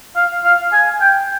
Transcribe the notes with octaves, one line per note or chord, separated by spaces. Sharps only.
F5
F5
G#5
G5